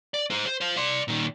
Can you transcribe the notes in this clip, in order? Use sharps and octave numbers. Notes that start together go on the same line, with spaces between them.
D5
G#4 C5
C5
C5 F5
D5 C6
A#2 D#3